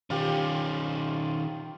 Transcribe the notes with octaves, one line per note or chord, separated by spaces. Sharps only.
D#3 C#4 F4 G4 C5